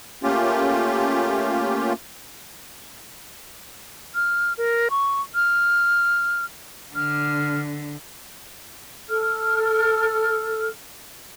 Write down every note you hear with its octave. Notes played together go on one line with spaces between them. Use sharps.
A3 A#3 C#4 F4 G4
F6
A#4
C#6
F6
D3 F6
A4 F6